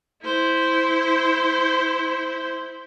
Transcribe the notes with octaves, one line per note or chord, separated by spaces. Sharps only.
E4 C5